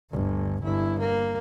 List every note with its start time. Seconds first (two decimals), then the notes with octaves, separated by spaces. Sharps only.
0.11 G1 D2
0.62 G1 E4
0.99 A#3